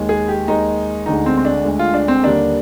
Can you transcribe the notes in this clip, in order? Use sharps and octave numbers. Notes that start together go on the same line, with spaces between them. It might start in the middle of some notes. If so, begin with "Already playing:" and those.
Already playing: D#2 D#3 G#3
G#4
G4
D#2 D#3 G#3 D#4
D2 D3 G#3 D#4
C4
C4
D4
D2 D3 G#3
F4
D4
C4
D#2 D3 G3 A#3 D4